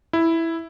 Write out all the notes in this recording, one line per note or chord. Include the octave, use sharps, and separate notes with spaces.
E4